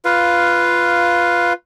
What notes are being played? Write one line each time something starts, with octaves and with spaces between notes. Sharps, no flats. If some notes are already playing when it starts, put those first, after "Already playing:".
F4 B4 F5